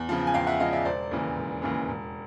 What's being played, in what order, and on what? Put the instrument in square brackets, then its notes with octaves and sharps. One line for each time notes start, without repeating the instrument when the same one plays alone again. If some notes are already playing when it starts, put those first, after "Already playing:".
Already playing: [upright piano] E2
C#3 F3
G#5
E2 F5 G5
E5 F#5
C#3 F3 D#5 F5
D5 E5
E1 C5 D5
D#2 C#3 E3
E1
D#2 C#3 E3
E1